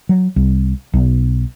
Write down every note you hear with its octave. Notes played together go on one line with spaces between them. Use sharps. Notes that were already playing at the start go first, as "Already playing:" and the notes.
F#3
C2
B1